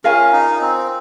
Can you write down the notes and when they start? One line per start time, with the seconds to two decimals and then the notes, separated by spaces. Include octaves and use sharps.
0.04 C#4 F4 A#4 F5 G#5
0.32 D#4
0.61 C4